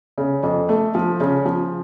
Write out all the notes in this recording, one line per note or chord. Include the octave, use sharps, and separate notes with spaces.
C#3
F2
A3
F3
C#3
F3